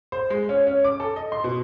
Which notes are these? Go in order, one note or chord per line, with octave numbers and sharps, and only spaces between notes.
C5
G#3
C#4
C#4
D6
A4
D#5
C6
B2